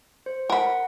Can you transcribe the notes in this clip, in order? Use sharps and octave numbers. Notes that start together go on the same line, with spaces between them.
C5
A#4 F#5 B5